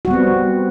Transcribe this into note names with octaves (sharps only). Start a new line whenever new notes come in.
G3 B3 C4 F#4